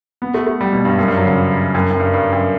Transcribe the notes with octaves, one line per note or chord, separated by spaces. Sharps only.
B3
A3
A3
G3
B2
G2
F#2
G2
F#3
C#3
F#2
F#2
G2
G2
F#2